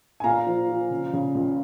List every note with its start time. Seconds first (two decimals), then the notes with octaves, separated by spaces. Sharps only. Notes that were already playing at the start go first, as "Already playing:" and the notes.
0.20 G#5
0.24 A#2 F5 A#5
0.47 F3
0.69 F3
0.91 C#3
1.13 C#3
1.35 C#2